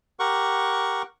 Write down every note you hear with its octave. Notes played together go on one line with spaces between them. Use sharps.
G4 A#4 F#5 C#6